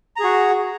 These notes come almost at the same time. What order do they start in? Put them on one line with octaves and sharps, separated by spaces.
A#5 G#4 F#4